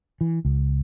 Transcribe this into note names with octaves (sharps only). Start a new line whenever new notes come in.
E3
C#2